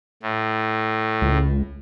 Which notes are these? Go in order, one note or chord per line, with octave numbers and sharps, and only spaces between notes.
A2
C#2